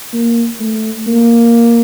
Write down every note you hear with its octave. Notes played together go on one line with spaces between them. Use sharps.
A#3
A3
A#3